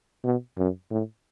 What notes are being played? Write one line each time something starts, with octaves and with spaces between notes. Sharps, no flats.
B2
F#2
A2